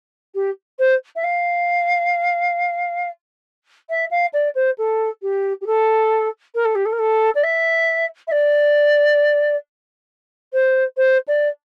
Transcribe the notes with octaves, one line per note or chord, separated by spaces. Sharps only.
G4
C5
E5
F5
E5
F5
D5
C5
A4
G4
G4
A4
A#4
A4
G4
A4
A#4
A4
D5
E5
E5
D5
C5
C5
D5